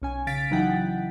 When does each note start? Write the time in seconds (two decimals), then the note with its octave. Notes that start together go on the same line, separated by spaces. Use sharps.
0.02 B1 C#4 G#5
0.27 C#3 F5 A6 B6 D7
0.51 E3 F#3 D#4 E4 F#5 G5